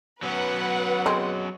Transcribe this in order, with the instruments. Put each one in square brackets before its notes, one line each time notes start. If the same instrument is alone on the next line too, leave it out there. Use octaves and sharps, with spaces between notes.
[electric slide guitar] F#3 B3 C#4 [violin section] B4 F#5
[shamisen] G#3 C4